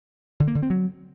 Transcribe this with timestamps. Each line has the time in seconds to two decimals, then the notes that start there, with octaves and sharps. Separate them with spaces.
0.40 D3
0.47 A#3
0.55 D3
0.63 C4
0.70 F#3